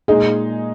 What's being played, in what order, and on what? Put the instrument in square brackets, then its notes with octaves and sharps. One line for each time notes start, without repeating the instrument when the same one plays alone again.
[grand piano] A#2 G#3 D#4 [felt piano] G#4